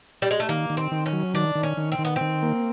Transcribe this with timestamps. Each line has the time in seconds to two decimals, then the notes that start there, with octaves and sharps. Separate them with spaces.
0.22 G3
0.31 G#3
0.40 A3
0.49 D#3 A#3
0.70 D#3
0.77 C4
0.92 D#3
1.06 C#4
1.13 F#3
1.34 D#3 D4
1.55 D#3
1.63 C#4
1.77 D#3
1.92 C4
1.99 D#3
2.05 B3
2.16 C4
2.21 D#3
2.42 A#3